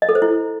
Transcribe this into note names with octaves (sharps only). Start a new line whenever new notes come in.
D#5
A4
C5
E4